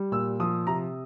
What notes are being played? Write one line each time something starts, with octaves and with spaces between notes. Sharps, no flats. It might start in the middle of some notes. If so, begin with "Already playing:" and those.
Already playing: G3
A#2 E6
F3 D#6
C3 A#5